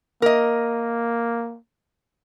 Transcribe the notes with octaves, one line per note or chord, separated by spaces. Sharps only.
A#3 A#4 D#5